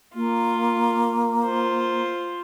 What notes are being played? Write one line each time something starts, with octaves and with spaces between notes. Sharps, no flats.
A#3 F4
F4 C5